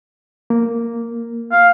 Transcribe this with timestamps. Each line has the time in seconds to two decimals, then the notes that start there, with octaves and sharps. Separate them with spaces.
0.50 A#3
1.52 F5